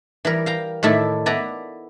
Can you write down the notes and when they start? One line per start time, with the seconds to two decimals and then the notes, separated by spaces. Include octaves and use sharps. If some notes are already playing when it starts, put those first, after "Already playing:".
0.25 E3 G3 A#4
0.46 F5 G5 A#5
0.83 A2 D#3 A3 E4 D5
1.26 B3 E4 B4 D5 A5 A#5